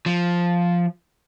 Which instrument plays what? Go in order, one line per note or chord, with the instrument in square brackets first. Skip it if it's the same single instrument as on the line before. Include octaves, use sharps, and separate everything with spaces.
[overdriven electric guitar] F3